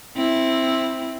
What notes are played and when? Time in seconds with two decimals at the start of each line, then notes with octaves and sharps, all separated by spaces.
0.17 C4 E4